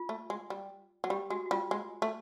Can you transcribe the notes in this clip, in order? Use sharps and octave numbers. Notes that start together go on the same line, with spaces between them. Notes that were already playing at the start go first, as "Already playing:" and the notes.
Already playing: F4
A3
G#3
G3
F#3
G3 G4
G#3 F#4
F#4
G3 F4
G#3
A3